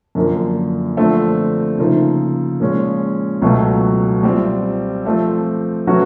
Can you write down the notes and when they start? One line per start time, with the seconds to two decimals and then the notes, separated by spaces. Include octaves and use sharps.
0.15 F#2 D3 F3 A#3
0.97 D3 F3 A3 C4
1.78 C#3 F3 A#3 D#4
2.60 A#2 F3 G#3 C#4
3.42 C#2 B2 F#3 A3
4.23 G3 C4 F4
5.05 F3 A3 C4
5.87 F#3 A3 C#4 F#4 B4